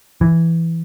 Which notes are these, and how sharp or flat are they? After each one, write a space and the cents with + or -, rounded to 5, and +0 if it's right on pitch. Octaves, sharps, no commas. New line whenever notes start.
E3 +5